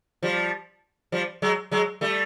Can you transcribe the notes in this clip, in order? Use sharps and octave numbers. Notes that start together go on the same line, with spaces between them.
F3 G3
F3 G3
F#3 G#3
F#3 G#3
G3 A3